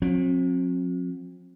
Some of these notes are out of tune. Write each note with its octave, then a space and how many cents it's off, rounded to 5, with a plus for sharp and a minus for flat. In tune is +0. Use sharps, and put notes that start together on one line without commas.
F#3 -45 C4 +35